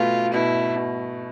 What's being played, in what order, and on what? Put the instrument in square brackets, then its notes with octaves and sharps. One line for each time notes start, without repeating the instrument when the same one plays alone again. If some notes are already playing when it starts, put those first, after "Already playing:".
Already playing: [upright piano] B2 A3 [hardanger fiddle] F4
[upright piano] B2 [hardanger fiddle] E4
[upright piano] B2